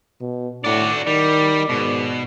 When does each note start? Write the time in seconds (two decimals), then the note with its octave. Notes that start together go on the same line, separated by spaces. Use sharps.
0.21 B2
0.64 A2 D4 F#4 D5
1.07 D#3 G3 D5
1.69 G#2 B2